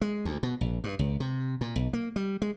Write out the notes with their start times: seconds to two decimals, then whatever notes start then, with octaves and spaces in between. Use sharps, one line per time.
0.01 G#3
0.25 D2
0.43 B2
0.61 A#1
0.84 G2
0.99 C#2
1.20 C3
1.61 A#2
1.76 B1
1.93 A#3
2.16 G3
2.42 G#3